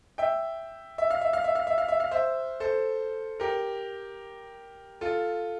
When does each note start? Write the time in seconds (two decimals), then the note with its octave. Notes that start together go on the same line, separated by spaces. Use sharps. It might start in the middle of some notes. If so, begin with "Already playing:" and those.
0.18 E5 G5
0.98 E5
1.10 F5
1.21 E5
1.33 F5
1.44 E5
1.55 F5
1.67 E5
1.78 F5
1.88 E5
2.00 F5
2.11 C5 E5
2.60 A4 C5
3.40 G4 A#4
5.01 F4 A4